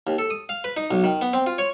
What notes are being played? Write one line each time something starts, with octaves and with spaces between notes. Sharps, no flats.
D#2
A4
D#6
F5
B4
D#4
B1
D#3
B3
C4
F4
C#5